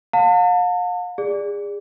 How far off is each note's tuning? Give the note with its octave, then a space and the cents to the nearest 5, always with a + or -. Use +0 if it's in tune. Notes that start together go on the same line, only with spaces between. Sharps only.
F5 +40 A5 +40
G#4 -30 D5 +0